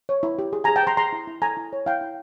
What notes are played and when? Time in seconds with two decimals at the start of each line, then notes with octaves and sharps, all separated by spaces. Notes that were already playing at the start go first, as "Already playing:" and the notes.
0.09 C#5
0.23 E4
0.39 G4
0.53 G#4
0.64 G#5 A#5
0.68 G#4
0.76 G5 A5
0.83 C5 A#5 C6
0.97 G#4 A#5 C6
1.13 E4
1.28 E4
1.42 A4 G#5 A#5
1.57 E4
1.73 C#5
1.86 E4 F5 G5
2.01 E4